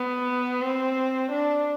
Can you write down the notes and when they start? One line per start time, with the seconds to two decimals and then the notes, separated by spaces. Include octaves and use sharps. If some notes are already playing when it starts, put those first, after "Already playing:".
Already playing: B3
0.62 C4
1.32 D4